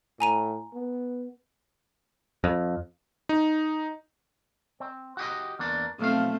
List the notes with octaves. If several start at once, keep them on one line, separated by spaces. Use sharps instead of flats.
A2 G#5 A#5 D#7
B3
F2
D#4
C4
F#4 G4 D#5
E2 A#3 D4
B1 F3 A3 C4 F5